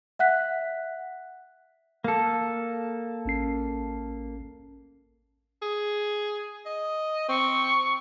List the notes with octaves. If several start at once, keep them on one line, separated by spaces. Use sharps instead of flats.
E5 F#5 F#6 B6
A#3 A4
A1 C#4 C7
G#4
D#5
C4 C#6